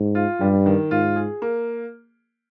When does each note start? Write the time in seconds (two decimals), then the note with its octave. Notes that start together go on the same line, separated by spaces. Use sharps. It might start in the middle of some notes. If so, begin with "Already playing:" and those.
Already playing: G#2
0.15 F4
0.41 G2 G3
0.66 D#3
0.91 G#2 F4
1.16 G#4
1.42 A#3